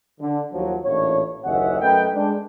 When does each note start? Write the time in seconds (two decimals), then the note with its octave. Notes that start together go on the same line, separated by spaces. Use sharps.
0.20 D3
0.53 D#2 F3 F#3
0.85 A1 A#2 D4 E4 C#5
1.45 F#1 D#2 C#4 D#5 E5 F#5
1.81 F#2 A3 A#4 B4 D#5 G5
2.14 G#3 D4